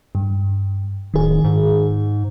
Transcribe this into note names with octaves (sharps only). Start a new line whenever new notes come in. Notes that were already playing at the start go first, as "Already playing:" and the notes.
G2
D1 D#3 G#4
G#2